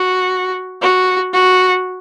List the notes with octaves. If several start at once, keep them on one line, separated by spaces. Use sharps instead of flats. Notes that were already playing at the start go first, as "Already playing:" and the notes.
Already playing: F#4
F#4
F#4